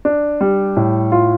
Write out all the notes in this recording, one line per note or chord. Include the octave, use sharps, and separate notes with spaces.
D4
G3
A2
F4